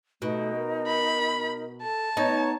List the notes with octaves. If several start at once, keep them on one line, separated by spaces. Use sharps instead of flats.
B2 A3 D#4
A#4
B5
A4 A5
B3 D#4 C#5